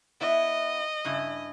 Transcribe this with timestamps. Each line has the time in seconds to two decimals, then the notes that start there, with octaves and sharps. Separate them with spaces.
0.21 B3 E4 D#5
1.05 G2 C#3 E4